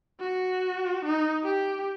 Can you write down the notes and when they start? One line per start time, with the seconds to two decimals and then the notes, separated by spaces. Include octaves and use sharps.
0.20 F#4
1.05 D#4
1.44 G4